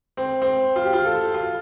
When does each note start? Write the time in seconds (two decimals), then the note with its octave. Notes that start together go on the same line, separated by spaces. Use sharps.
0.17 C4
0.42 C4
0.76 F4
0.85 G4
0.93 F4
1.06 A4
1.34 F4